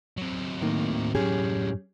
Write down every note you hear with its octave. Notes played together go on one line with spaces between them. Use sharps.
F#3 C4
A2 D#3 A#3
F#2 A2 C#4 G4 G#4